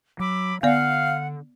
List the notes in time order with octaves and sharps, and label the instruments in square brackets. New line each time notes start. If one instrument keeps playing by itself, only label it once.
[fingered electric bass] F#3 [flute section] B5 D6 E6
[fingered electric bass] D3 [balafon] B3 D5 [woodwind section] F5 [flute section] F#5